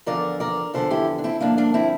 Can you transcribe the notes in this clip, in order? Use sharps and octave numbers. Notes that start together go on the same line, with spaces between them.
E2 D3 F3 A#4 D5
A#4 D5
E2 D3 F3 A4 C5
E4 G4
D4
C4 E4
G2 D3 F3 A#3 D4
A#3 D4
C4 E4